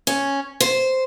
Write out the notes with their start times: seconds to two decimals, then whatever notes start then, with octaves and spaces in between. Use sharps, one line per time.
0.07 C#4
0.60 C5